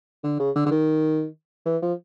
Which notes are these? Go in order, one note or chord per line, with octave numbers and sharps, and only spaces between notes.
D3
C#3
D3
D3
D#3
E3
F3